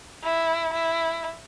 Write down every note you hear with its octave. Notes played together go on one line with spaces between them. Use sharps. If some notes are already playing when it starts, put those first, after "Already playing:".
E4
E4